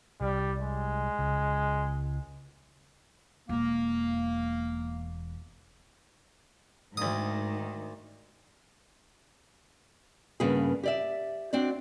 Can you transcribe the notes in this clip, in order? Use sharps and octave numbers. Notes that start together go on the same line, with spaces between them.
C2 G3
G#3
C#2
E1 E2 A#3
D2 G#2 D#3 D#6
G2 C#3 A#3 B3 G#4
G4 D5 E5
C4 D4 F#4 D5